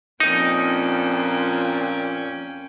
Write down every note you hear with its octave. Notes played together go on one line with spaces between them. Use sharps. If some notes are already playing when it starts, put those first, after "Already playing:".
F2 A#2 C#4 D#4 G5